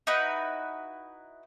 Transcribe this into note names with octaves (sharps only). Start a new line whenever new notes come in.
D#4 E4 F#4 B4